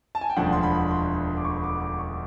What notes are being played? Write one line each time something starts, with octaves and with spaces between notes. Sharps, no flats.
A5
G#5
G5
E1 D2 D3 F3 F#5
C6
B5
C6
D6
C#6
D6
D6
C#6